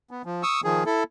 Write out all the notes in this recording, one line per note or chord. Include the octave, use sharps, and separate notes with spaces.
B3
F3
C#6 D#6 E6
D#3 F3 G#4
E4 A4